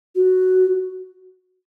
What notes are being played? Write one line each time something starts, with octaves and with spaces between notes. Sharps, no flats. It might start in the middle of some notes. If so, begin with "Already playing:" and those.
F#4